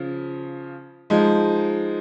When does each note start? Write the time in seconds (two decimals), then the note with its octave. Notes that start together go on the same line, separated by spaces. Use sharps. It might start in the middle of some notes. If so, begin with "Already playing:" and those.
Already playing: C#3 F3
1.10 F3 G#3 D#4